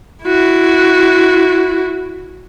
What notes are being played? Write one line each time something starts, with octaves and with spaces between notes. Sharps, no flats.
E4 F#4